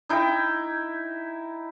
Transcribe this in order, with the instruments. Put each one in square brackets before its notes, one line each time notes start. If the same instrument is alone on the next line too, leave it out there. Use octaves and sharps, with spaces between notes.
[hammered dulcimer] D#4 E4 G5